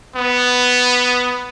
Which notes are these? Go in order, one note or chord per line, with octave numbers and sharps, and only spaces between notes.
B3